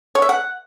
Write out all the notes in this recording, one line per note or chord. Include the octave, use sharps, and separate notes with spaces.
C#5
E5
F#5